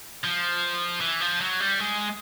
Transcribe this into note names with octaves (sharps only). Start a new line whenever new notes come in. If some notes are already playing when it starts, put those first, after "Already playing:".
F3
E3
F3
F#3
G3
G#3